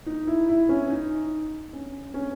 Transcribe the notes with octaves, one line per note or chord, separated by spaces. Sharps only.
D#4
E4
E4
C#4
D#4
C#4
C#4